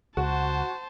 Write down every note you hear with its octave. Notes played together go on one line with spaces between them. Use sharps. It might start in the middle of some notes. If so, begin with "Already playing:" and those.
C#2 F#4 C5 A5